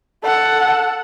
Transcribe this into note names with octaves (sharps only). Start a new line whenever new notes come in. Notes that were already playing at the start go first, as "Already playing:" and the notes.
A4 F#5